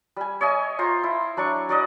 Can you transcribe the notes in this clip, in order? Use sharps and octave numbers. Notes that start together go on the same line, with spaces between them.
G3 G#5
C#5 D#5 E5 G#5
F4 C5 A#5
E4
F#3 D4 D5 C#6
F#3 D5 D#5